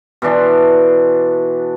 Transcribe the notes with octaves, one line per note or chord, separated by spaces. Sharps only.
B2 E3 D4 C6